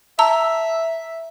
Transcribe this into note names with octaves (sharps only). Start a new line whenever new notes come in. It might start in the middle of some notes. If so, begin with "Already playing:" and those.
E5 A5 A#5 E6